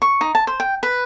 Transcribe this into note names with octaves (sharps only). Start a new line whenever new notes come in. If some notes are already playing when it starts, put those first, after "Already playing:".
C#6
D#4
A5
C5
G5
B4